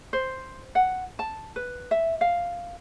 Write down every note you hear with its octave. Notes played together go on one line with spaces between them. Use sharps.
C5
F#5
A5
B4
E5
F5